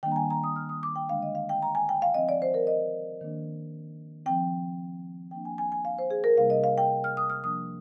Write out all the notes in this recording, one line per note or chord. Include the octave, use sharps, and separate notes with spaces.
D#3 G3 A#3 D4 G5
A#5
G#5
A#5
D#6
F6
D#6
D6
G5
D3 G#3 D4 F5
D#5
F5
G5
A#5
G#5
G5
F5
F3 C4 D#5
D5
C5
A#4
D#5
D#3 A#3 D4
F3 C4 G5
F3 A#3 D4 G5
G#5
G#5
G#5
F5
C5
G#4
A#4
C3 G3 A#3 D4 F5
D#5
F5
G5
F6
D#6
F6
F3 A#3 D4 D#6